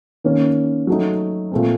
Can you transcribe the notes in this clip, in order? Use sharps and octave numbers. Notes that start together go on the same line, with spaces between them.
D#3 A#3 C#4
F#3 A3 D#4
A#2 A3 C4